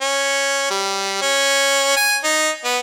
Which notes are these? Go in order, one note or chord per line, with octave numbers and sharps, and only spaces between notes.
C#4
G3
C#4
G#5
D#4
B3